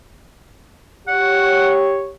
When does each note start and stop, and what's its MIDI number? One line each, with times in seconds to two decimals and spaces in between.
1.08 2.14 67
1.08 2.14 73
1.08 1.75 78